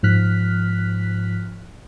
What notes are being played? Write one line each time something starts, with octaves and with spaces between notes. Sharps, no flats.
G#2 F3 F6 F#6 B6